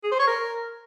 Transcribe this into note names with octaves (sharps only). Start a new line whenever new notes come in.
G#4
C5
C#5
A#4